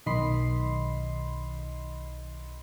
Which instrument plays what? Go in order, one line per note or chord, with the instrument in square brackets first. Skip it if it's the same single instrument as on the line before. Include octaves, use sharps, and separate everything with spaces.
[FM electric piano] B1 D#3 D#5 B5 C6 C7